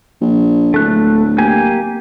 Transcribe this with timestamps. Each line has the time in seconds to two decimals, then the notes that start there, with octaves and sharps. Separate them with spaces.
0.21 A#1
0.74 D1 A3 F#6
1.38 A#3 G4 G#5